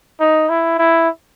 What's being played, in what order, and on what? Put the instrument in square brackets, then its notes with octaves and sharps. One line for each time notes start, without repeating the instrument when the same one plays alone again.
[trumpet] D#4
E4
E4